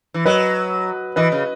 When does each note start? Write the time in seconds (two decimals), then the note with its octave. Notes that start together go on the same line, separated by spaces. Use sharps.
0.14 E3
0.25 F#3 B4 D#5
1.16 E3 B4 D#5
1.32 C#3